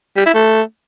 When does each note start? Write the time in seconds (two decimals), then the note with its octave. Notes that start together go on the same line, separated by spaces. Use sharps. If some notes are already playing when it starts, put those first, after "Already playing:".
0.17 G3
0.26 E4
0.34 A3